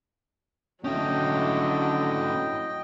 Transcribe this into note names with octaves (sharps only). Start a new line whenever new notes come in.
D3 F#3 C#4 E4 D#5 G5